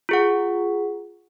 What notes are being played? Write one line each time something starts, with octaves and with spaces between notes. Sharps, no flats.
F4 G#4 F#5